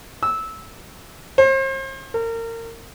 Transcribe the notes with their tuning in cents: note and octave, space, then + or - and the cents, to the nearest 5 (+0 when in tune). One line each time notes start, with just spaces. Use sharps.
E6 -15
C5 +40
A#4 -30